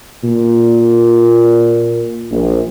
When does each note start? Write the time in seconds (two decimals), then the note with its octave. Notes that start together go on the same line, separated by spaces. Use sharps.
0.24 A#2
2.31 A#1